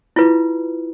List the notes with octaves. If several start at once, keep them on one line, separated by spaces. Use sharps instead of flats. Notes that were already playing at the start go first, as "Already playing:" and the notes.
E4 F4 B4